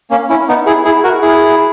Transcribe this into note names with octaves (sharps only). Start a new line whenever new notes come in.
A#3 C#4
C#4 E4
B3 D#4
E4 G#4
E4 G#4
F#4 A#4
E4 G#4